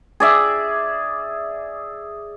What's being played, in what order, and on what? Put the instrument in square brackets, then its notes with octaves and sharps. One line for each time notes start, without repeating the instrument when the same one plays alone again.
[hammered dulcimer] G#4 D5 E5